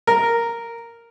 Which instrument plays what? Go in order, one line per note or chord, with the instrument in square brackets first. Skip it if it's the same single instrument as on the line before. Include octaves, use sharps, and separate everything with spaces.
[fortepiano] A#4